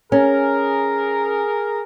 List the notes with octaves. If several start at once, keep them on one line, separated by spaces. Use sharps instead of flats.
C#4 G#4 A#4